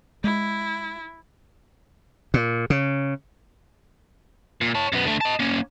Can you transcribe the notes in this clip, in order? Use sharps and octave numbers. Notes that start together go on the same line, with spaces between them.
G#3 E4
A#2
C#3
A#2
C#5 A5
F#2 B3
D3 A3
D#5 A5
A#3 C#4